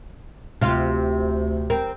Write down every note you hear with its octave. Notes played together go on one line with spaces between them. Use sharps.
D2 C3 F4
C4 A#4